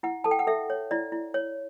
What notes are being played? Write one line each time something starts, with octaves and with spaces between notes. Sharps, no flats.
E4 F#5
A4 A5
G5
F#5
A4 E5
C#5
E4 D5
E4
C#5